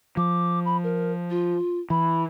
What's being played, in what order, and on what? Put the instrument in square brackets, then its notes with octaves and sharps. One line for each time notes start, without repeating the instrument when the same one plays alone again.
[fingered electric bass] F3 [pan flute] D6
[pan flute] B5
A#4
F4
[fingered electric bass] E3 [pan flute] B5